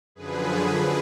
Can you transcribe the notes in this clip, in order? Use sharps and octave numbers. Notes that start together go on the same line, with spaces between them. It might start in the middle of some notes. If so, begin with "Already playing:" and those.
F#2 D3 F3 G#4 B4